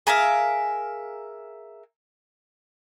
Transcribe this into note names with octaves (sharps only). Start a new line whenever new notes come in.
G#4 A#4 E5 F5